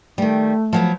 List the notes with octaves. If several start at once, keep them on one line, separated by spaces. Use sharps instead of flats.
D#3 G3 A3
F3 F#3 B3